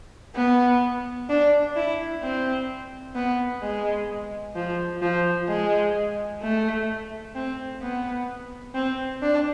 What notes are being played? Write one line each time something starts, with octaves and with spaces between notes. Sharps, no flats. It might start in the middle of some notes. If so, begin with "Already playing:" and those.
B3
D4
E4
C4
B3
G#3
F3
F3
G#3
A3
C4
B3
C4
D4